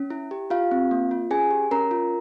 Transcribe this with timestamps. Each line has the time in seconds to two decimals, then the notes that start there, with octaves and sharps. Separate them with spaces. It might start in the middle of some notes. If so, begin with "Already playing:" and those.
Already playing: C#4
0.10 E4
0.31 G4
0.50 F4 G4 F5
0.71 C4
0.91 A#3
1.11 F4
1.31 C#4 G#4 G#5
1.51 G4
1.71 C#4 A#4 A#5
1.91 F4